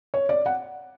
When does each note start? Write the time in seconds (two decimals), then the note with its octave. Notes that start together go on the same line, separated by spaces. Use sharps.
0.14 C#5
0.29 D5
0.46 F#5